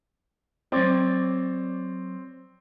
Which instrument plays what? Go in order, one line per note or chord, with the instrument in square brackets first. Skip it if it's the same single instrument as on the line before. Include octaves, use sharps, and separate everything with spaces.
[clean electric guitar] F#3 C#5 D5 [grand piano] C4